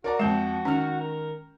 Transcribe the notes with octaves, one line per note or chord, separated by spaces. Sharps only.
F#4 A#4 D5 A#5
F2 G#3 G6 E7
D#3 C#4 F6
A#4